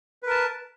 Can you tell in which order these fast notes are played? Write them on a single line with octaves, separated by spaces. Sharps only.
B4 A#4 A5